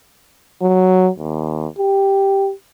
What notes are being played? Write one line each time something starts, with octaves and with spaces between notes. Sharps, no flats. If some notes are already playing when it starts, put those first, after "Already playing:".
F#3
D#2
G4